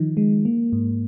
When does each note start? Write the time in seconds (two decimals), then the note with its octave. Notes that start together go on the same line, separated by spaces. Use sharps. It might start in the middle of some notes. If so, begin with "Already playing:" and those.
Already playing: D#3 F3 D#4
0.17 G#3
0.45 A#3
0.73 G#2